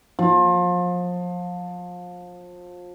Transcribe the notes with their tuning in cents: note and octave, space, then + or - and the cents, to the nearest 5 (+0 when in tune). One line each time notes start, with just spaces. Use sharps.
F3 +30